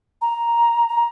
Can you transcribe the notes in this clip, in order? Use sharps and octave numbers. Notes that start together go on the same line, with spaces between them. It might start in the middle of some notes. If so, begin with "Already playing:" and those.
A#5
A#5